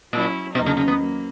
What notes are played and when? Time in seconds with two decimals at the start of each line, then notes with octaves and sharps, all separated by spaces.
0.13 A#2 F#3 C#4 E4
0.55 E2 B2 D#3 F#3 A#3 D#4
0.66 C#3
0.77 C#3
0.88 B3
0.99 F#3 A#3